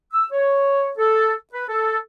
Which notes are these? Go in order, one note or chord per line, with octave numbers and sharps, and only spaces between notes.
E6
C#5
A4
B4
A4